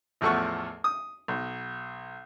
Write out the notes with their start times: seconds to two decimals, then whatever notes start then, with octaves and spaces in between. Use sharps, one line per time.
0.21 A1 E2 F3 A3 F#5 C#6
0.84 D#6
1.28 B1